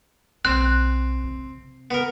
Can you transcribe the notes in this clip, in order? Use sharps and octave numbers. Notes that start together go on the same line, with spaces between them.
B1 C3 C4 F#6
C3
B3 A#4